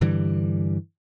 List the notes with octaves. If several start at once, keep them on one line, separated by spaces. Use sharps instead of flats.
G2 D3 E3 G3